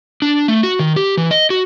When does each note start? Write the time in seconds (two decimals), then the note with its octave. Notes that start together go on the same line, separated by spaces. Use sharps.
0.22 D4
0.48 A3
0.63 F#4
0.79 D#3
0.96 G4
1.17 E3
1.31 D#5
1.50 F#4